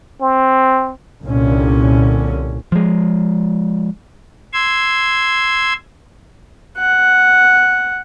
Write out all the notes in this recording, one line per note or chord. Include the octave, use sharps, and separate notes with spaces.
C4
C2 A#2 D3 C#4
F3 G#3
C6 E6 G#6
F#5